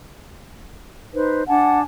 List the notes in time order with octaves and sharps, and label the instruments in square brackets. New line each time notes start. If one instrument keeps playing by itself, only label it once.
[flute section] D#4 B4 C5
[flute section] D4 G#5 A5 [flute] F#5